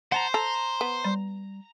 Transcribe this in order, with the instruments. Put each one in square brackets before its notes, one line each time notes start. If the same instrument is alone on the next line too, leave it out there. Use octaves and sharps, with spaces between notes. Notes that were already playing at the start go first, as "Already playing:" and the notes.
[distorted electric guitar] C5 [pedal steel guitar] F#5 A5 A#5
[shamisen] A4 [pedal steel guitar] A#5
[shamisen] B3
[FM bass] G3